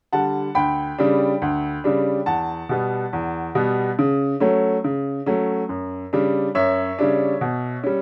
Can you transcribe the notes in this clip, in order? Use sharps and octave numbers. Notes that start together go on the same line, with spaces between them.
D3 G3 F#5 A5
D2 G5 B5
C#3 G3 D4
D2
C#3 G3 D4
E2 F#5 A5
B2 G3 B3
E2
B2 G3 B3
C#3
F#3 A3 C#4
C#3
F#3 A3 C#4
F#2
C#3 G3 D4
F#2 C#5 E5
C#3 G3 D4
B2
G3 C#4